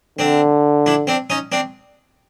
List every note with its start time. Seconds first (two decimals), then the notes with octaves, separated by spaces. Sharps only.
0.19 D3 C4 D4
0.86 D4 E4
1.07 C4 D4
1.30 C#4 D#4
1.52 C4 D4